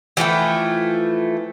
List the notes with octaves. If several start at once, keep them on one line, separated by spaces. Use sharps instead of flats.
E3 F3 A3 G5